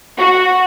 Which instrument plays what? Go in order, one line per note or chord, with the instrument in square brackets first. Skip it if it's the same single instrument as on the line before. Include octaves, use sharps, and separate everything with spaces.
[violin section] F#4